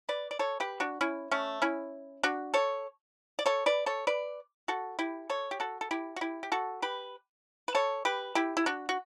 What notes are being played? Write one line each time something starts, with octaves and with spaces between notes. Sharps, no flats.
B4 D5
D5
A4 C#5
G4 B4
D4 F#4
C#4 E4
A3 C#4
C#4 E4
D4 F#4
A4 C#5
D5
A4 C#5
B4 D5
A4 C#5
B4 D5
F#4 A4
E4 G4
A4 C#5
G4
F#4 A4
A4
E4 G4
F#4
E4 G4
G4
F#4 A4
G4 B4
B4
A4 C#5
G4 B4
E4 G4
E4
D4 F#4
F#4